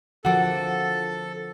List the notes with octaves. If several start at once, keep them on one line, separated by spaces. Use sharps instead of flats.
D3 F3 F#4 A4 A#4 D6